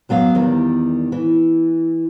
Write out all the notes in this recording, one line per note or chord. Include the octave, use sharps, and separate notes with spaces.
F#2 F#3 B3 F5
E2 D#3 G3
E3